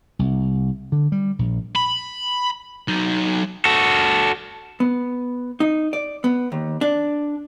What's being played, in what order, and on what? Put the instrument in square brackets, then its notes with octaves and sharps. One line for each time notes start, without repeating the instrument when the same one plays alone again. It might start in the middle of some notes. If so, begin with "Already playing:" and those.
[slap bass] C2
D3
G3
A#1
[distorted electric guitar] B5
F#3 D#4
[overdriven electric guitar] F#4 A4
[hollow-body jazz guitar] B3
D#4
D5
B3
D#2
D4